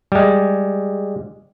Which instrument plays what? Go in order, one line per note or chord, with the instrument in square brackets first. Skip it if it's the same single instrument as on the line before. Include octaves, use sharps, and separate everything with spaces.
[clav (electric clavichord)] G3 G#3